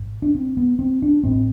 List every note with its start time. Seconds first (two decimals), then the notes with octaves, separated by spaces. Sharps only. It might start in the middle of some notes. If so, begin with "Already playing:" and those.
Already playing: A1 G#2
0.22 D4
0.35 C4
0.57 B3
0.79 C4
1.02 D4
1.23 A1 A2 C4